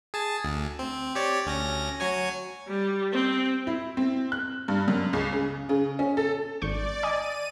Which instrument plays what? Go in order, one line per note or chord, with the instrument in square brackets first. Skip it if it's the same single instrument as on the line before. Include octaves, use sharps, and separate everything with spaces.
[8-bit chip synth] G#4 A5
D2
C4
G4 C#5 D5
D2 C#4 A#6
F#3 C#5 G#5
[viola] G3
C4
[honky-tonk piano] E4
C4
F#6
G2
F#2
C#2
C#3
C#3
C#4
A4
[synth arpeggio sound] G#1 C#6 G6 [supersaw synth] D5
[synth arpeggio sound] D#5 G#5 [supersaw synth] D#7